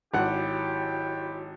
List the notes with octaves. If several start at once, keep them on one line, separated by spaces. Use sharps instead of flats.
G#1 F#3 E4 G4 F#5